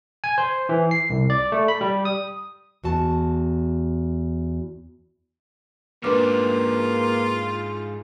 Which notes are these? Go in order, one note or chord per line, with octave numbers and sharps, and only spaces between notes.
G#5
C5
E3
C7
C2
D5
A3
B5
G3
D#6
E2 F#4 A5
G#2 A#3 D4 F4 B4 D6 F6